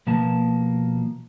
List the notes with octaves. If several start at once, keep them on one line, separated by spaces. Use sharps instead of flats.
B2 F3 A#3 A5